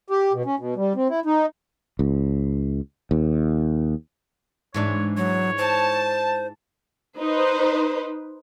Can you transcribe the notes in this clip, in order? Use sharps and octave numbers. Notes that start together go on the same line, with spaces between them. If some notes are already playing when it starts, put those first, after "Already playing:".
G4
B2
C#4
B2
G3
C4
E4
D#4
C#2
D#2
G#2 E3 D4 C#5
F#3 C#5
C5 A5
D#4 B4 C5